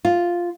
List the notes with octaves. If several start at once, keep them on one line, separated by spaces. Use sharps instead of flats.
F4